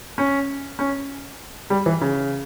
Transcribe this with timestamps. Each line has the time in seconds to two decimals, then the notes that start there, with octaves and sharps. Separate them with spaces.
0.18 C#4
0.79 C#4
1.70 G3
1.86 E3
2.01 C#3